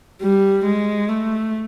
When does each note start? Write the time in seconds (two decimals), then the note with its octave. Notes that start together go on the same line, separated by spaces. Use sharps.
0.22 G3
0.65 G#3
1.09 A3